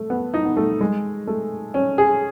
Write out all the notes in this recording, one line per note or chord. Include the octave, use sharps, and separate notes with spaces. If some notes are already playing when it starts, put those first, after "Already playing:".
Already playing: A3
B3
D#4
B3
A3
G#3
A3
C#4
G#4